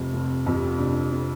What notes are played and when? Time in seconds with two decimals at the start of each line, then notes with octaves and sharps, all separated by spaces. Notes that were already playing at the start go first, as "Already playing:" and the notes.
Already playing: F1 F2 C3 C4
0.13 F1
0.46 F2 C3
0.58 G4
0.68 F4
0.78 F1 D4
1.11 C3